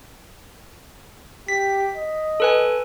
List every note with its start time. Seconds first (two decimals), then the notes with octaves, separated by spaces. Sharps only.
1.48 G4 B6
1.95 D#5
2.40 A4 B4 G#5